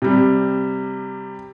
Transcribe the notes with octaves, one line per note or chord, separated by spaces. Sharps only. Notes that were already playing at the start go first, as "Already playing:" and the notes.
C3 G3